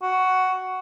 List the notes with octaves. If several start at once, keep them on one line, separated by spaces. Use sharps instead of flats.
F#4